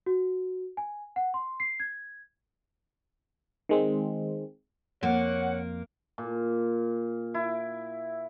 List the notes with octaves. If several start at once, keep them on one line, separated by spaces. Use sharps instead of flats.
F#4
G#5
F#5
C6
C7
G#6
D#3 G#3 C4
F2 A#3 C#5 F#5
A#2
E4